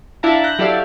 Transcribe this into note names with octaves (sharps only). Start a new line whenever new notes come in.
D4 E4 F5 A5 A#5
F#6 G6 A#6
F#3 E4 G4 A4 D5 F5